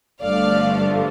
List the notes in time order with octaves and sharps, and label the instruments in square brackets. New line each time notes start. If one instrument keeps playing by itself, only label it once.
[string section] G1 G2 F3 A3 D4 D5 F5